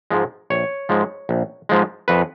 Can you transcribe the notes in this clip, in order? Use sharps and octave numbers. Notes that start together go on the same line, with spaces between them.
G#2 F3 G#3
A#1 C#5
G#2 F3 G#3
A#1
G#2 F3 G#3
F2 B4